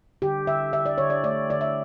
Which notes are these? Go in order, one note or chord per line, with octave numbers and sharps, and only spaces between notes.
D3 G4
D3 E5
D3 E5
D5
D3 C#5
D5
A3 D5
D3 D5
E5